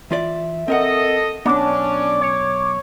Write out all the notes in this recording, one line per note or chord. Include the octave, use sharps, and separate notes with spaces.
E3 F4 D5 E5
C4 A4 A#4 D#5 F#5
B1 B3 C#4 D4 D6
C#5